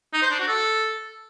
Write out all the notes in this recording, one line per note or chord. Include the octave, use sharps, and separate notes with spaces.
D#4
C5
D4
F#4
A4